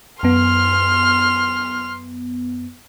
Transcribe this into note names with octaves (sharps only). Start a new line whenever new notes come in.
F#2 B3 C6 F6